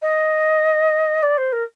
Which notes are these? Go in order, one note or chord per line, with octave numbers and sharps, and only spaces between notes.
D#5
D5
C5
A#4